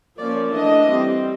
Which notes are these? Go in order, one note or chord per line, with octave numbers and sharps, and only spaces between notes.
F3 A#3 C#4 D5
E3 A3 D4 D#5
G3 C4